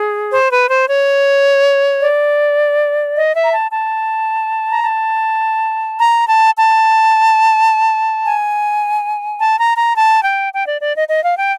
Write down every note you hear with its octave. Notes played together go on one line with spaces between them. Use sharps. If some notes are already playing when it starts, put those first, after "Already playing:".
Already playing: G#4
C5
B4
C5
C#5
D5
D#5
E5
A#5
A5
A5
A#5
A5
A#5
A5
A5
G#5
A5
A#5
A#5
A5
G5
G5
D5
D5
D#5
D#5
F5
G5